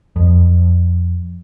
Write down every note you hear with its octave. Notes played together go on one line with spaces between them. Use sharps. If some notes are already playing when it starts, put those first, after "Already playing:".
F2